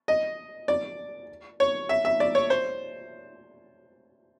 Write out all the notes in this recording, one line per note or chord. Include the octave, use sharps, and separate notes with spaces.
D#5
D5
C#5
E5
E5
D5
C#5
C5